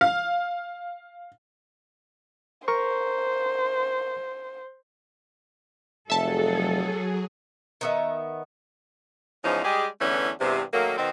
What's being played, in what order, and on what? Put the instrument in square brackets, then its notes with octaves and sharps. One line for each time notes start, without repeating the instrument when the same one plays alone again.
[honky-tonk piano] F5
[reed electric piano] A#4 A#5 C#6 [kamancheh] C5
[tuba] F1 [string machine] F#3 G#4 [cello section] A4 [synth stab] E5 A5
[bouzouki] D#3 B3 E5
[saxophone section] E2 G#2 F3 C#4 D#4
G3 G#3 G4 G#4
E2 D3 E3 A3 C#4
E2 G2 C3
D#3 F#3 A3 A#3
B2 D#3 C4